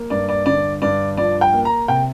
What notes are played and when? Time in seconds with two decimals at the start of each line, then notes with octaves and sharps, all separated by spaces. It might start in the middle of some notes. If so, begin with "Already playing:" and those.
Already playing: A#3
0.10 G2 D5
0.29 D5
0.46 D3 D5
0.82 G2 D5
1.17 F3 D5
1.41 G5
1.53 A#3
1.65 A#5
1.88 C3 G5